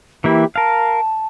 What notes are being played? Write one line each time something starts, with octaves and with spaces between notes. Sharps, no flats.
E3 A#3 E4 G4
A#4 F5 A5